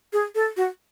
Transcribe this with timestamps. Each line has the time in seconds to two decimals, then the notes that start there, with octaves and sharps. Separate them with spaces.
0.13 G#4
0.35 A4
0.57 F#4